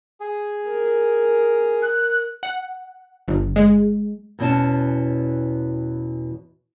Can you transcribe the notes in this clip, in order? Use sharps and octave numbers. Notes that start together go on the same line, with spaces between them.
G#4
A#4
F#6
F#5
G1
G#3
E2 B2 E3 C#4 A5